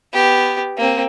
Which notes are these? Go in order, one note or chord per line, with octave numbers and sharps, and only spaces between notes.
B3 G4
A#3 C4